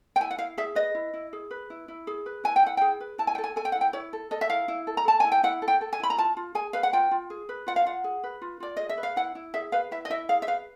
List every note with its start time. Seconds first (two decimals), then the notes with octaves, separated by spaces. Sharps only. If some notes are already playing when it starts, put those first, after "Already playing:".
0.16 G5
0.20 E4 G#5
0.31 F#5
0.38 E4 F5
0.58 G#4 E5
0.75 B4 D#5
0.95 E4
1.14 E4
1.33 G#4
1.51 B4
1.70 E4
1.88 E4
2.07 G#4
2.26 B4
2.44 E4 G#5
2.56 G5
2.64 E4 F#5
2.77 G#4 G5
3.00 B4
3.18 E4 A5
3.27 G#5
3.35 G5
3.38 A4
3.44 G#5
3.56 A4 G#5
3.65 G5
3.72 E4 F#5
3.81 G5
3.93 E4 C#5
4.13 A4
4.31 A4 D#5
4.41 E5
4.50 E4 F5
4.68 E4
4.87 A4
4.97 A#5
5.05 A4 A5
5.20 E4 G#5
5.32 G5
5.43 E4 F#5
5.62 A4
5.68 G5
5.81 A4
5.93 G#5
6.00 E4 B5
6.10 A#5
6.18 F4 A5
6.37 F4
6.55 G#4 G#5
6.73 B4 F5
6.83 F#5
6.93 F4 G5
7.11 F4
7.30 G#4
7.49 B4
7.67 F4 F#5
7.76 F5
7.85 F4 F#5
8.04 G#4
8.24 B4
8.42 F4
8.60 F4 D5
8.77 G#4 D#5
8.89 E5
8.98 B4
9.03 F5
9.16 E4 F#5
9.35 E4
9.54 G#4 E5
9.72 B4 F5
9.91 E4 E5
10.05 D#5
10.10 E4 E5
10.29 G#4 F5
10.42 E5
10.47 B4 F5